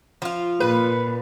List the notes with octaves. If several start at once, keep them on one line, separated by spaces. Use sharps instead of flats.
F3 F4
A#2 B4